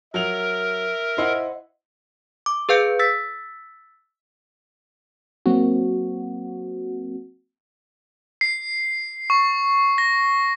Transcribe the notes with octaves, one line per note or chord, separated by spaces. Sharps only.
F#3 A#4 E5 F7
E4 C5 D#5 F#5
D6
G#4 B4 F5 G6 C#7 D7
E6 A6 B6
F#3 A#3 C4 F#4
C7
C#6
A#6